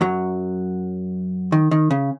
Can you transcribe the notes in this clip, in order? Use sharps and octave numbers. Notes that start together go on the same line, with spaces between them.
F#2 F#3
D#3
D#3
C#3